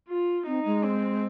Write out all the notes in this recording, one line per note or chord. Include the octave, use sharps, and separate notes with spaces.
F4
C4 D#4
G#3
C4